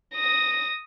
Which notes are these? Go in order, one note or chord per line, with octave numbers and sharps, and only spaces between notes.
D#6 A#6